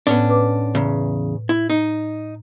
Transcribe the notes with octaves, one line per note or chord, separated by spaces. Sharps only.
A2 B3 C#4 D4
B4 D6
E2 C#3
E4
D#4